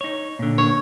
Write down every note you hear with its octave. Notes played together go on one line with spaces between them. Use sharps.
D#4 C#5
A#2 D3
C#5